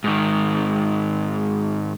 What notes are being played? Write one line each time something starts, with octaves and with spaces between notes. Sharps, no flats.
G#2 D#3